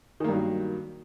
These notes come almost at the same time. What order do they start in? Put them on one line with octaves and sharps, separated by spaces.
D#3 A#3 G2 F#3